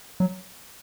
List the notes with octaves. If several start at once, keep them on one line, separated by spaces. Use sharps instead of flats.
F#3